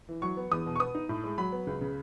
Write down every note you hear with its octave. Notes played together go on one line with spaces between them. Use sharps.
E3
F#3 C#6
B3
E2 D#6
B2
C#6
B3 D#6
D#4
A2
G#3
F#3 B5
B3
C#2
C#3